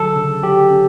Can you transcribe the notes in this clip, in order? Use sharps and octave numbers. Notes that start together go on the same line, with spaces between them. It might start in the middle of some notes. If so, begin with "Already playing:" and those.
Already playing: D3 F#3 A4
C#3
F#3 G4
C#4